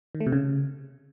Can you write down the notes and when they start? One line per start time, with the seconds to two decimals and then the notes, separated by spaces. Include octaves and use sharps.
0.15 D#3
0.21 A3
0.26 C3
0.32 C#3